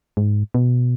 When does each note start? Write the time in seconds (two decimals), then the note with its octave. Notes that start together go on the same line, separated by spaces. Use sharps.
0.17 G#2
0.54 B2